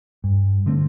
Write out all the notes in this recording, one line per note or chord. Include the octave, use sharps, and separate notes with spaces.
G2
D3 A3 C4